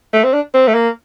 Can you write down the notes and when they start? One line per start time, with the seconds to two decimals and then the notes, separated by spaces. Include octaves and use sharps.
0.13 A3
0.24 C4
0.33 D4
0.54 C4
0.67 A3
0.74 A#3